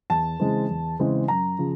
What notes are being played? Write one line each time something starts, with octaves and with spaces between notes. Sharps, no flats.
E2 A5
C#3 E3 G#3 C4
E2
C#3 E3 G#3 C4
F#2 A#5
C#3 F3